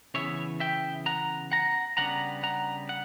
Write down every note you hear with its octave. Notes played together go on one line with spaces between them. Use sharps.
C#3 E3 B3 C#5 E5
E5 G5
F#5 A#5
F#5 A#5
C#3 G3 B3 D4 F#5 A#5
F#5 A#5
F#5